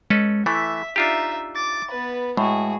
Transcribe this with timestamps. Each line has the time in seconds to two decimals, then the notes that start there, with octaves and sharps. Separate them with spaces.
0.10 G#3 C#4 A4 B4
0.46 E3 A3 E5 B6
0.96 D4 D#4 F4 G4 E5
1.56 D6 A6
1.91 B3 B4
2.37 A2 G#3 F#4 G#4